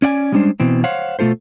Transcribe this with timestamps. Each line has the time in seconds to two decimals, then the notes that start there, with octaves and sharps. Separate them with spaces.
0.02 C#4 D5 F#5 G#5
0.32 G3 G#3 C#4 D4 C5
0.60 B2 E3 C4
0.84 C5 C#5 F5 F#5
1.19 B2 A3 F4 A4 C5